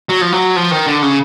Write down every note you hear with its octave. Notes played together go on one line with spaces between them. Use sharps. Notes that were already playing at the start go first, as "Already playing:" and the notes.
F#3
F3
F#3
F3
D#3
D3
C#3